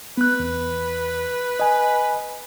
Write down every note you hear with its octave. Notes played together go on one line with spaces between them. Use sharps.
B3 B4 F#6
E2
D#5 G#5